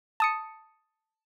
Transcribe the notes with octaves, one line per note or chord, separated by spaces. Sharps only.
A5 D#6 C#7